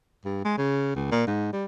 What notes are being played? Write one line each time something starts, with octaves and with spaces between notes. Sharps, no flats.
G2
G#3
C#3
C#2
A#2
G#2
G3